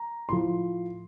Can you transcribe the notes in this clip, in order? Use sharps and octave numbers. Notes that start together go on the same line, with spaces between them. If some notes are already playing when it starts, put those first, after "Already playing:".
Already playing: A#5
A2 F3 C6